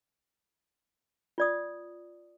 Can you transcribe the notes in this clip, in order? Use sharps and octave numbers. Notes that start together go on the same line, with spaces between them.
F4 D5 D#6